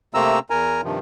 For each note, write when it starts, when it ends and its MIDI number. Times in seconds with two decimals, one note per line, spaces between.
0.14 0.39 48
0.14 0.39 57
0.14 0.39 58
0.14 0.39 60
0.14 0.39 82
0.14 0.39 88
0.50 0.81 40
0.50 0.81 70
0.50 0.81 80
0.50 0.81 82
0.84 0.99 43
0.84 0.99 48
0.84 0.99 51
0.84 0.99 53